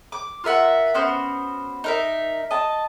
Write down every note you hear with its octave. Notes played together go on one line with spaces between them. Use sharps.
D6
F4 A#4 E5 F#5
B3 C#4 F#4 C5
D#4 A#4 E5
D#5 A5